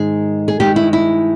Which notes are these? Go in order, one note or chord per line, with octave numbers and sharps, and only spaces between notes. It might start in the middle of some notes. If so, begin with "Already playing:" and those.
Already playing: G#2 D#3 G#3 G#4
G#4
G2 D#3 G#3 G4
E4
E4